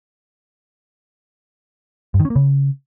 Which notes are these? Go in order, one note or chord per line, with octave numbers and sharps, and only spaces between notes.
G2
D#3
C#4
A#3
C#3